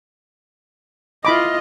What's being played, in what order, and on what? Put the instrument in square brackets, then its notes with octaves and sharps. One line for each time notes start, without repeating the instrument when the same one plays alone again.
[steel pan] E4 B5 D6 [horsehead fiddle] F4 D#5